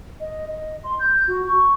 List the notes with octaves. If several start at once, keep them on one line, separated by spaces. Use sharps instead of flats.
D#5
D#5
C6
G6
F#4
C#6